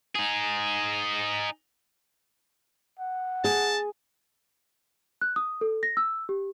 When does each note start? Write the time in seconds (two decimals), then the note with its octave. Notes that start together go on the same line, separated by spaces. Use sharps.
0.15 D#4 G#4
2.99 F#5
3.44 G#4 A5
5.21 F#6
5.36 D#6
5.61 A4
5.83 A#6
5.97 E6
6.29 G4